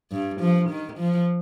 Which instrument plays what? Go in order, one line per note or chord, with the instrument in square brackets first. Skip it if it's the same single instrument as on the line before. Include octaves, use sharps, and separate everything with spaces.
[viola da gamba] G2
F3
D#3
F3